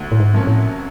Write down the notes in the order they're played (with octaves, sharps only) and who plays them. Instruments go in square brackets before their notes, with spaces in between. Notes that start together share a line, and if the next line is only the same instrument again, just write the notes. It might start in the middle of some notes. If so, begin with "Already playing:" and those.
Already playing: [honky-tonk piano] D2
[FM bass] A2
G#2
[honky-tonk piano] C3 F3 A#3 C#4
[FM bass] A2